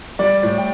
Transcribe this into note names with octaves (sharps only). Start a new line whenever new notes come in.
G3 D5
A2
G5